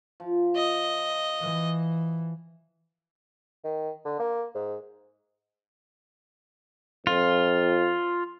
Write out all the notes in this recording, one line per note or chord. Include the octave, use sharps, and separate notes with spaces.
F3
D#5
E3
D#3
D3
A#3
G#2
F2 F4